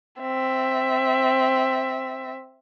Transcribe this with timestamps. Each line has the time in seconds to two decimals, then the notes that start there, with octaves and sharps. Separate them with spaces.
0.21 C4 E5